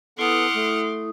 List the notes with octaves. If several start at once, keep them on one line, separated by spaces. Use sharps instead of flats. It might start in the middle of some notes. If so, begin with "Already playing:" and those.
B3 E4 A4 F#5 C6 D6 D#6 F6
A3